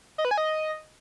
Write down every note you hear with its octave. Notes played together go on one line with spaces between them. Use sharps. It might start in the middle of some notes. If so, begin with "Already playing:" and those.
D#5
B4
G#5
D#5